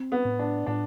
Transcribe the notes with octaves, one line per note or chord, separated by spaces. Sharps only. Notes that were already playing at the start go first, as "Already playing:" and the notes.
Already playing: C4
B3
A2
D4
A2 D4